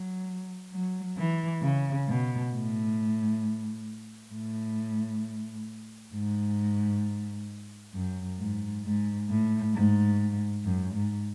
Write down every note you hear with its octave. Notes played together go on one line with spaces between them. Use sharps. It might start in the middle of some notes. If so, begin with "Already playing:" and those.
Already playing: F#3
F#3
E3
C#3
B2
A2
A2
G#2
F#2
G#2
G#2
A2
G#2
F#2
G#2